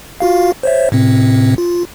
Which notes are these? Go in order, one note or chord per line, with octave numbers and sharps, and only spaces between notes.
F4 F#4 F5
C5 C#5 E5
A2 C3 C4
F4